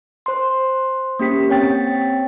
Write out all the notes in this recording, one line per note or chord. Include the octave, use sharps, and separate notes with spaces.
C5 C6
A#3 C#4 G4 B6
C4 C#5 G5 A6